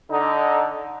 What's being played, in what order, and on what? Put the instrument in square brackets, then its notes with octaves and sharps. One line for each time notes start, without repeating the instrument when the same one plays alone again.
[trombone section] D3 D#4